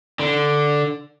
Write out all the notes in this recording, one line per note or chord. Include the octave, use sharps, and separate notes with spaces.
D3